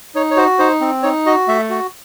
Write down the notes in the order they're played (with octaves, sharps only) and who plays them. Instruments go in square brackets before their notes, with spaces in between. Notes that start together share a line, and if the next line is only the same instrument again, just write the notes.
[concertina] D#4 C#5
C#5
F#4 C5
D#4 C5
C4
D#4 C#5
F#4 D#5
A3 E5
F#4